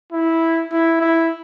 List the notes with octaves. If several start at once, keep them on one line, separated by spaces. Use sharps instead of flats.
E4
E4
E4